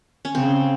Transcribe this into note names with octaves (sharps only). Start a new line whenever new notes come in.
C#4
C#3 C4